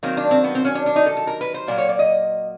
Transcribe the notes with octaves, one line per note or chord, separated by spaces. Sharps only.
D#3 F#3 A#3 C4
D4
C4
B3
C4
C#4
D4
D4
D#4
A4
A4
A#4
B4
C5
A#2 F#3 A#3 D5
C#5
D5
D#5